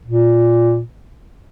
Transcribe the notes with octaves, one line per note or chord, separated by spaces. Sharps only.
A#2